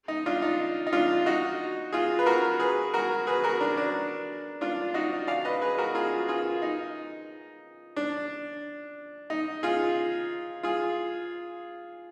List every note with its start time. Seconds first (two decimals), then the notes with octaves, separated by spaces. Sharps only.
0.08 D#4
0.26 D4 F4
0.42 D#4
0.87 D#4
0.93 D4 F4
1.26 D#4 F#4
1.92 F4 G#4
2.19 B4
2.26 F#4 A#4
2.59 G#4 B4
2.94 F#4 A#4
3.27 G#4 B4
3.44 F#4 A#4
3.60 D4
3.77 D4
4.61 D4 F4
4.94 D#4 F#4
5.27 D5 F5
5.45 B4 D#5
5.61 G#4 B4
5.78 F#4 A#4
5.95 F4 G#4
6.28 F4 G#4
6.62 D#4
7.97 D4
9.30 D#4
9.63 F4 G#4
10.63 F4 G#4